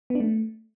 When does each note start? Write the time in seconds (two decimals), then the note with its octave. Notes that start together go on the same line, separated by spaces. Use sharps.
0.10 B3
0.15 D4
0.20 A3